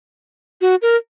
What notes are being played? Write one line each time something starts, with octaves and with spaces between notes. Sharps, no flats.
F#4
A#4